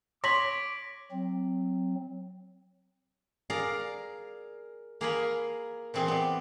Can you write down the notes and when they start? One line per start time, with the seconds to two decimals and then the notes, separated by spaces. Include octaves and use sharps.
0.24 C#5 C6 D6 A#6 B6 F#7
1.11 F#3 C4
3.50 G#4 A#4 D5 F5
5.01 A#3 G#4 A#4 F5 G#5 B5
5.94 A#2 E3 C4 G#4 C6
6.08 B3 D5